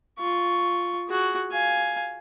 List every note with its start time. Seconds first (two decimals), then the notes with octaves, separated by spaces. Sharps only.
0.19 F4 C#6
1.08 F#4 G#4
1.51 F5 G#5